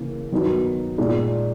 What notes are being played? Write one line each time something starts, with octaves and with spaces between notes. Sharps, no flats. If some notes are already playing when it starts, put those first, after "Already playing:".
Already playing: C#3 E3 A#3
D#3 F#3 B3 D#4 F#4
A#2 G#3 D#4